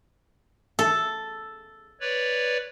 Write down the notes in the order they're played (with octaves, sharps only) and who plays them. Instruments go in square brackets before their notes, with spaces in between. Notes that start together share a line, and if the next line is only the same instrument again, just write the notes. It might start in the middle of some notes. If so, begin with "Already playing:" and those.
[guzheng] A4
[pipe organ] B4 C#5 D5